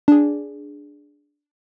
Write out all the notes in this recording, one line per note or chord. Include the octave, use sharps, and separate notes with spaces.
D4 G#4